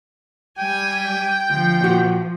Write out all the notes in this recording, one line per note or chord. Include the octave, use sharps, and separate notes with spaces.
G3 G5 G#5
D2 F3
A#2 F#4